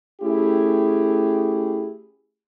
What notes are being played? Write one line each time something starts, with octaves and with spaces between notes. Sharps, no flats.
A3 C#4 E4 G4 G#4